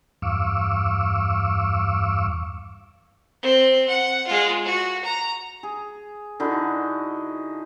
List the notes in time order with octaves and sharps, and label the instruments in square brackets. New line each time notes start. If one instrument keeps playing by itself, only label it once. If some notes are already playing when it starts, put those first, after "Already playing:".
[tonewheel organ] E2 G2 F5 C#6 D6 E6
[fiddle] C4
F#5
G#3 F4
F#4
A#5
[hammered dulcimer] G#4
D3 D#4 E4 F#4